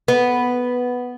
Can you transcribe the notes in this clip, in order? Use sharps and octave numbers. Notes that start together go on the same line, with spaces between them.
B3